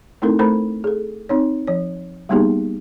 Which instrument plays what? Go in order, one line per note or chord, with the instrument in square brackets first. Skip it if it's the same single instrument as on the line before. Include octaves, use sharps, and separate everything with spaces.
[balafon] A3 C4 D#4 E4 A4 A#4
A3 A4 A#4 C5 A#5 B5
G#4 A4
C4 D#4 C#5
F3 C#5
G3 A#3 B3 D#4 G4 G#4